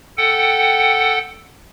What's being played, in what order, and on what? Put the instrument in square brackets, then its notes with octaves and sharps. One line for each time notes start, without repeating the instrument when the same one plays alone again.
[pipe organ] A4 F#5 G5